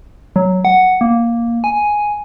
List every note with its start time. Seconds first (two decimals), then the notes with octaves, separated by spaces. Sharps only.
0.36 F#3
0.65 F#5
1.01 A#3
1.64 G#5